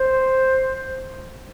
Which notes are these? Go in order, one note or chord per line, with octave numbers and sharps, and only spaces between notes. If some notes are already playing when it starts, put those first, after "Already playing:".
Already playing: C5